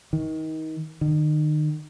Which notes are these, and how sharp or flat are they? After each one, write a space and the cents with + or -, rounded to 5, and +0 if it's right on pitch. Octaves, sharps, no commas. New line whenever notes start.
D#3 +25
D#3 -35